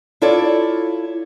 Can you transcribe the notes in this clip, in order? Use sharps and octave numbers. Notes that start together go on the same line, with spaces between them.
E4 F4 A4 C#5 D5